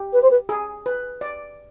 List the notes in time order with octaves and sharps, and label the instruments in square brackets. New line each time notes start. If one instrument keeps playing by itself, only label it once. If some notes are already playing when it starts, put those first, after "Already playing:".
Already playing: [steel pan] G4
[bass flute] B4
C5
B4
[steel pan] G#4
B4
D5